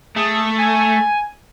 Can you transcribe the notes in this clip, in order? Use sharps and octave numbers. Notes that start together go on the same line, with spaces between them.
A3 G#4
G#5